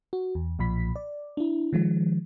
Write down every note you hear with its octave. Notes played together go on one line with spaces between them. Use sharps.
F#4
E2
B1 A#2 F3 B5 B6
D5
D4 E4
D#3 F3 G#3